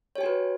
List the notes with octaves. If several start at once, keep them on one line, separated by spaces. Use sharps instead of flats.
F#4 G4 B4 C#5 G#5